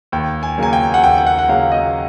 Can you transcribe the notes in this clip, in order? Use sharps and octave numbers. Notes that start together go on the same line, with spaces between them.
D#2 G5
G#5
C#3 F#3 A#3 G#5
G5
F#5
D#2 G5
G5
F#5
F#5
C#3 F#3 A#3 F5
D#5